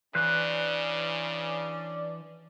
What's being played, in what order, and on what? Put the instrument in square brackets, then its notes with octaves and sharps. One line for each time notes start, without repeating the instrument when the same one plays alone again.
[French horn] C#3 [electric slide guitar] E3 B4 C5 [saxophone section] C#4 D4 D5